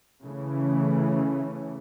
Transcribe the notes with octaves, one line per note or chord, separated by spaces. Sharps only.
C#3 E3 A3 C#4